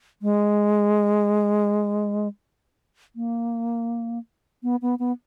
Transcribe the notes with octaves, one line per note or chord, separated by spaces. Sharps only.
G#3
A#3
B3
B3
B3